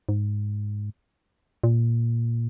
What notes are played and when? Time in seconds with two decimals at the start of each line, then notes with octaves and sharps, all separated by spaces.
0.09 G#2
1.64 A#2